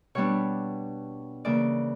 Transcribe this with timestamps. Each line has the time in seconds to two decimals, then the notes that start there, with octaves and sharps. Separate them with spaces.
0.15 B2 G3 B3 D4 C#5
1.45 C#3 E3 A#3 D5